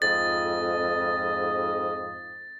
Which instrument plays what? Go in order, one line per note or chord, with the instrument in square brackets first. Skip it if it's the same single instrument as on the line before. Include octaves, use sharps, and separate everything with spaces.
[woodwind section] F2 G#2 [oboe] D#5 [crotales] A6